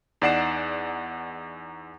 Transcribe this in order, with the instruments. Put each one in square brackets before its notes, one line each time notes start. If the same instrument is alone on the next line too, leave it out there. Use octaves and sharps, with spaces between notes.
[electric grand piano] E2 D#4 D5 F#5 C7 E7